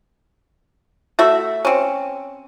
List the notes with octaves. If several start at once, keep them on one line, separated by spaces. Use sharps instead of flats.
A3 F#4 E5
C4 C#4